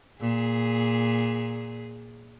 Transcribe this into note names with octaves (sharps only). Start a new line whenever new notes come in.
A#2 G#4